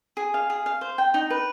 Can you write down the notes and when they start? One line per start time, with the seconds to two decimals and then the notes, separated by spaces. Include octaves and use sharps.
0.17 G#4
0.34 F5
0.50 G#4
0.66 F5
0.81 C5
0.98 G5
1.14 D#4
1.30 B4